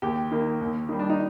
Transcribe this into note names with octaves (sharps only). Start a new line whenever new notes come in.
D#2 G4
D#3 A#3
D#2
D#3 G3
D4
D#4